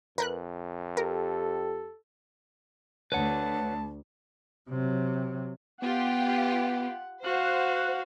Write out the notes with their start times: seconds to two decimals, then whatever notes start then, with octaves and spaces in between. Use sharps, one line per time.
0.18 F2 A#4 B4 F#6
0.97 G4 A4 A#4
3.12 D2 B4 C#5 F#5 A5
4.70 C3 F#3
5.82 B3 F4 G4 F#5
7.24 F#4 C5 F5 F#5 F#6